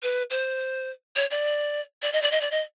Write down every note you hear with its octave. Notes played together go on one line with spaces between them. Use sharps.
B4
C5
C#5
D5
D5
D#5
D5
D#5
D5
D#5